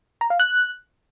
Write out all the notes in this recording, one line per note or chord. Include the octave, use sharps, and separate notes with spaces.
A#5
F5
F#6